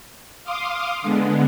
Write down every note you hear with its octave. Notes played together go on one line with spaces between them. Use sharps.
F5 C6 D6 D#6
D3 G#3 B3